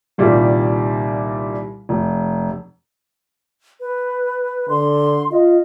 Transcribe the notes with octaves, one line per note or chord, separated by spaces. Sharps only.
C2 A#2 D#3 G3
F1
B4
D3 C6
F4 D#5